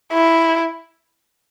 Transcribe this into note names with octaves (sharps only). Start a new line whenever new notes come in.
E4